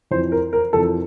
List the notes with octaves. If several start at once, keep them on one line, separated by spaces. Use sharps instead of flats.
F2 E3 C5
A#4
A#4
F2 E3 A4